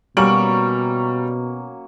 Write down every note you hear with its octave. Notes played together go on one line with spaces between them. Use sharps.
B2 F#3 G3 A#3 C#4 C#6 D7 F#7